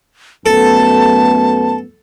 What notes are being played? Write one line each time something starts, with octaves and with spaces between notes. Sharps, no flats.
F#2 A3 B3 A4 A5